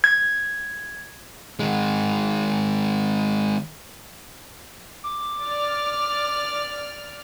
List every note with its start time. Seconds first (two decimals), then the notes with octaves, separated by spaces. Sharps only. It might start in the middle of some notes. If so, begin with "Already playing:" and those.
0.04 G#6
1.60 D#3 G#3
5.04 D6
5.41 D5 F6